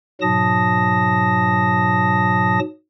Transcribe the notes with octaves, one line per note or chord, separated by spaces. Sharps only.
G#2 B2 F#3 A5 D#6 A#6